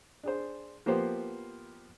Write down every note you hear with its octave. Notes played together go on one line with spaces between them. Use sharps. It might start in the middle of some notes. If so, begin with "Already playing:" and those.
D4 G#4 C5
F3 A#3 B3 G4 C5